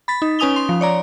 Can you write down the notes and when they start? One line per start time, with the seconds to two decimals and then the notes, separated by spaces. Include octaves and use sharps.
0.08 B5 A6 B6
0.22 D#4
0.39 C#4 B4 G#5 D#6 F7 G7
0.56 C6
0.69 F3
0.81 C#5 D5 A#5